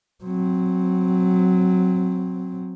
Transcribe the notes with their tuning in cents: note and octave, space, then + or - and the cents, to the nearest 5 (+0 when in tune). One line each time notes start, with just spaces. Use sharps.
F#3 -10 C4 +0